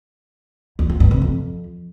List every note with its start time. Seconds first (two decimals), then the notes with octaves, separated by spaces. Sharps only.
0.79 E2
0.90 F3
1.00 G2
1.11 C3
1.22 F2